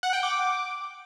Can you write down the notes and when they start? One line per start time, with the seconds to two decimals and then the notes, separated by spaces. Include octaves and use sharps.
0.03 F#5
0.13 G5
0.23 D6